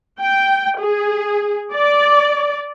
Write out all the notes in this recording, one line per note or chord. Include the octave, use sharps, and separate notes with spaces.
G5
G#4
D5